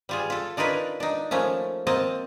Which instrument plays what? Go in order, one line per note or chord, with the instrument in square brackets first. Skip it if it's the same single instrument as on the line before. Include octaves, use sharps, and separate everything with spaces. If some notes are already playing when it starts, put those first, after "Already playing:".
[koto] G3 F4 G#4
F4 A4
D4 D#4 F4 A#4 B4 C#5
D4 D#4
F3 A3 A#3 C#4
A#3 C4 D#5 A5